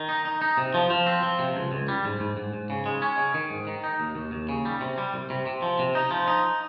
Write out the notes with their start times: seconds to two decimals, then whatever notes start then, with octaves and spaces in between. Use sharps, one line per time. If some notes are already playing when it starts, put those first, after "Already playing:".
Already playing: D#3
0.09 D#4
0.25 D#4
0.42 D#4
0.57 C3
0.74 F3
0.90 F3
1.06 C4
1.23 F3
1.39 C3
1.55 C#2
1.72 C#2
1.88 G3
2.05 G#2
2.20 G#2
2.37 G#2
2.54 G#2
2.70 C#3
2.86 G#3
3.02 C#4
3.18 C#3
3.34 D#3
3.50 G#2
3.67 D#3
3.84 D#4
4.00 D#2
4.15 D#2
4.32 D#2
4.49 C#3
4.65 G3
4.81 C3
4.98 G3
5.14 C2
5.30 C3
5.46 C3
5.62 F3
5.79 C3
5.95 D#4
6.11 F3
6.28 D#4